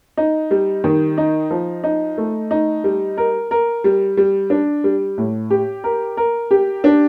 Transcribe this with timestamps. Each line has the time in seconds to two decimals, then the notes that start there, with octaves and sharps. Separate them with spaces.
0.17 D#4
0.51 G3
0.84 D#3
1.18 D#4
1.51 F3
1.84 D#4
2.17 A3
2.51 D#4
2.84 G3
3.17 A#4
3.51 A#4
3.84 G3
4.17 G3
4.50 D4
4.84 G3
5.18 A2
5.50 G4
5.84 A#4
6.17 A#4
6.51 G4
6.84 D4